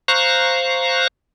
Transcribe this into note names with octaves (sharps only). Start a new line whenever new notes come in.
C5 F5 A#5 C#6 F#6